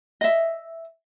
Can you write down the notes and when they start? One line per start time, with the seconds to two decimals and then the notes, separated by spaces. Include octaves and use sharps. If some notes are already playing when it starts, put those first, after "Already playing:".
0.21 D#5 E5